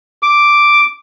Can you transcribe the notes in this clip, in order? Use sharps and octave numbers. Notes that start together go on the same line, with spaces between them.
D6